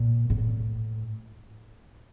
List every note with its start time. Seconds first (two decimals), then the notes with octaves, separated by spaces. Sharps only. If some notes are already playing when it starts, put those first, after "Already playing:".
Already playing: A#2
0.30 A2